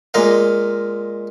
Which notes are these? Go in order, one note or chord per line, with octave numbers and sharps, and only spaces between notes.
A#2 G#3 A#4 F5